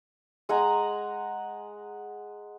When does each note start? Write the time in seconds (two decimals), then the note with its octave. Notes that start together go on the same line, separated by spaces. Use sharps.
0.49 G#3 F#5 G#5 A#5